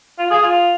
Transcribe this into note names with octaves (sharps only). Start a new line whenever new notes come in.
F4
G#4
F4